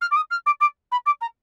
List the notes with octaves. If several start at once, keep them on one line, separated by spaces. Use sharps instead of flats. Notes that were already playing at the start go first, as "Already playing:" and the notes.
F6
D6
D#6
F6
D6
D6
B5
D6
A#5